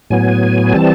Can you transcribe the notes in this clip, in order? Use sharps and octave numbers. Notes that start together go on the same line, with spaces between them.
A2 F#3 B3 G#5
E3 G3 C4 A5